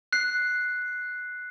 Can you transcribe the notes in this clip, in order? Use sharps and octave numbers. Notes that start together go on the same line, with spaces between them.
F#6 C7